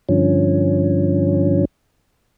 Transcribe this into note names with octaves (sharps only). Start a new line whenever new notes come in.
G2 D3 F3 C#4